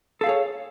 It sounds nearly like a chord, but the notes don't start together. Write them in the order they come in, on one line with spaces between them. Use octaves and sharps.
A4 F5 G#4 C#5